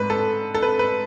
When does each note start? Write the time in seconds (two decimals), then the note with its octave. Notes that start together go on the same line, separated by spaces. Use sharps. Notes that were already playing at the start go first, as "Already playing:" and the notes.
Already playing: G#2 A3 B4
0.10 A4
0.55 A4
0.63 B4
0.79 B4